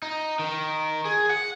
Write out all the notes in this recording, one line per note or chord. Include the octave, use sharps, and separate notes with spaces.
D#4
D#3
G#4
F#5